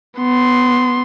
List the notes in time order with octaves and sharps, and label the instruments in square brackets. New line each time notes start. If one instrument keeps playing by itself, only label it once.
[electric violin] B3 C6